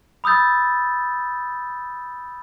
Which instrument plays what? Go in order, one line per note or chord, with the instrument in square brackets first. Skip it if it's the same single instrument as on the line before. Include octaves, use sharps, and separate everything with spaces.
[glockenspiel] B5 D#6 E6 G6 A6